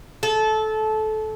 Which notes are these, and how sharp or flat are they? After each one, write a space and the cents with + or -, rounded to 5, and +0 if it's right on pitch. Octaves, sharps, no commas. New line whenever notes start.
A4 -20